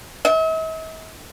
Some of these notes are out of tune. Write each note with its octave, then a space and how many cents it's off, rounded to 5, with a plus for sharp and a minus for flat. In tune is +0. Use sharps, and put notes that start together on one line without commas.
E5 -45